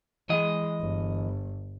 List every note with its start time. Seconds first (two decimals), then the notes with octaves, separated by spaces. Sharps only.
0.29 E3 G#3 D#5
0.80 G1